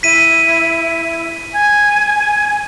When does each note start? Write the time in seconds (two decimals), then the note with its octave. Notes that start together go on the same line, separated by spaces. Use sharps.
0.03 E4 B6 D#7
1.54 G#5